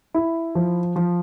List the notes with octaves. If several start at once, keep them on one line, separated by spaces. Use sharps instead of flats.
E4
F3
F3